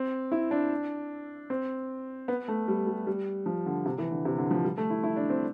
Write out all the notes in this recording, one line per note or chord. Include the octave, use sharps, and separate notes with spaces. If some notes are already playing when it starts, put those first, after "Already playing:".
Already playing: C4
E4
D4
C4
B3
A3
G3
G3
G3
F3
D3
C3
E3
D3
C3
D3
F3
G3
A3
E4
E4
D4
C4